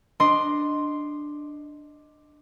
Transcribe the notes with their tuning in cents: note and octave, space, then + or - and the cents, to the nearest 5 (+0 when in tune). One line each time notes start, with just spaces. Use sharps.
D4 +5 D#5 +0 C6 +0